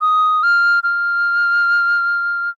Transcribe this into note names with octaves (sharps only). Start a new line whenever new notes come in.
D#6
F6
F6